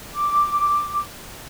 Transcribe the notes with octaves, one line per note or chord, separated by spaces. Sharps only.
D6